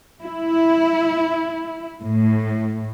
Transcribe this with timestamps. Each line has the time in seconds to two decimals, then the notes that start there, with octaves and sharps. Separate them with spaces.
0.22 E4
2.04 A2